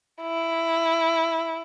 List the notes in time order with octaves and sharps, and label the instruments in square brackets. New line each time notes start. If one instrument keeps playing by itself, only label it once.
[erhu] E4